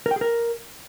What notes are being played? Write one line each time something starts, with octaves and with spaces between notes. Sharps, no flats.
A#4
G5
G#4
A#4